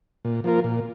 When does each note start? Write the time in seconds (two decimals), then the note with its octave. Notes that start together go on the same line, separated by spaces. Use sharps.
0.25 A#2
0.44 F3 A#3 F4 A#4
0.64 A#2